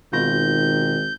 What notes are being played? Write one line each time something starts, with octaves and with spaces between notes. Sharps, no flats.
G#1 B2 D#3 F4 G6 A#6